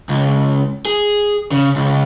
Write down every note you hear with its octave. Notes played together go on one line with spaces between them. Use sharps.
C#2
G#4
C#3
C#2